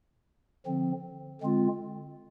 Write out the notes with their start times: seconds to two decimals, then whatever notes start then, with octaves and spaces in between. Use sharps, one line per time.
0.66 D3 F3 C4
1.41 D3 G#3 C4 F4